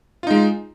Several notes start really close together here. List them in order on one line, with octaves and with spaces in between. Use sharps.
F4 D#4 G#3